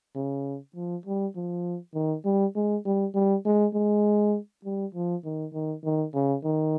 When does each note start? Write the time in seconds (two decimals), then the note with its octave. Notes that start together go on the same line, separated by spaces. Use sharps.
0.15 C#3
0.75 F3
1.06 G3
1.36 F3
1.94 D#3
2.25 G3
2.55 G#3
2.85 G3
3.14 G3
3.45 G#3
3.74 G#3
4.65 G3
4.94 F3
5.25 D#3
5.53 D#3
5.84 D#3
6.14 C#3
6.44 D#3